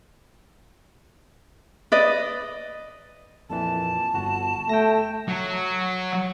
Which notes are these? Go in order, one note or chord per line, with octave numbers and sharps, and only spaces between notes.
B4 D5 D#5
F2 A#2 E3 A5
G1 F#4
A3 G5 A#6
F#3